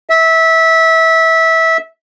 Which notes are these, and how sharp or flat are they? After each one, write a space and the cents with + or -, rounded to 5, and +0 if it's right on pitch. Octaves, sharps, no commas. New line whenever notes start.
E5 -20